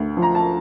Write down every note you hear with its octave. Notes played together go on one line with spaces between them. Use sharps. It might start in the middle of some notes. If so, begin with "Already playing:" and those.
Already playing: D2
F3
A#5
A5